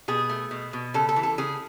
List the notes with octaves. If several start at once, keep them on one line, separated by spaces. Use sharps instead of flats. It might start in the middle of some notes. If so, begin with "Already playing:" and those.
B2 G#4
A3
B2
B2
C#3 A4
A4
E3
A4
C#3 G#4